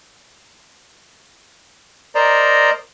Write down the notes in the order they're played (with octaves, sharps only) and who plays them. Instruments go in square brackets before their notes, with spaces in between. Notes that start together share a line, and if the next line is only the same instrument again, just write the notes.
[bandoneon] A#4 C5 D5 D#5 A#5